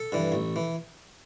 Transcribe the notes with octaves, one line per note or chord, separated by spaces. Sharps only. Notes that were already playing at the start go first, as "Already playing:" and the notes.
Already playing: A4
G2 E3
A1
E3